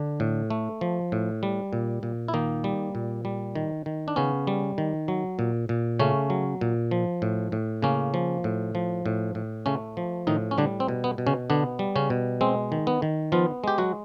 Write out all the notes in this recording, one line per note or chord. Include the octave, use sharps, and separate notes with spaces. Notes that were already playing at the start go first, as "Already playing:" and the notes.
Already playing: D3 D4
A2
A3
F3
A2
G3
A#2
A#2
E4
D#3 A#3 D#4
G3
A#2
G3
D#3
D#3
D4
C#3 B3 C#4
G3
D#3
F#3
A#2
A#2
C#3 A3 C#4
F#3
A#2
F3
A2
A2
C#3 A#3 C#4
F3
A2
F3
A2
A2
C#3 A3 C#4
F3
A2 D#3 D#4
C#4
D3 G3 D4
C4
B2
B3
B2
C#3 C#4
D3 B3 D4
G3
C#3 C#4
B2
G#3 C4
D#3
B3
D#3
F3 B3 F4
G#3 G4
F#3 F#4